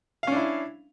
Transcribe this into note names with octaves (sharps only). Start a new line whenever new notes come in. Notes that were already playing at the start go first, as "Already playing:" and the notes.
C#4 D4 E4 F5